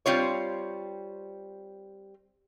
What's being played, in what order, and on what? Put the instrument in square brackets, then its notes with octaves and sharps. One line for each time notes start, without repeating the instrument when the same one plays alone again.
[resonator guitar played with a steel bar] G3 C4 F4 C#5